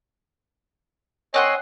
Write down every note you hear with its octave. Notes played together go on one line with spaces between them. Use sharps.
C4 C#5 D#5 F#5 G#5 C6